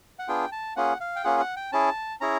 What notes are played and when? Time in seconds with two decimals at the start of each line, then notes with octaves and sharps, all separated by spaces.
0.19 F#5
0.28 B3 D4 F4 G#4 G5
0.52 A5
0.76 A#3 C#4 F4 G#4 F#5
1.00 F5
1.16 G5
1.24 A#3 C#4 F4 G#4 F#5
1.40 F#5
1.56 G5
1.72 C#4 E4 G#4 A5
2.21 C#4 E4 G#4 A#5